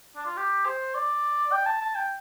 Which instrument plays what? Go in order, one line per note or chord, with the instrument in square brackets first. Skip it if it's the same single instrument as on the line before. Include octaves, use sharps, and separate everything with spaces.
[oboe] D4
F4
G4
C5
D5
G5
A5
A5
G5